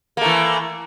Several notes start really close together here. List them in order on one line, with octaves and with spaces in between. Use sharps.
A#3 A3 E3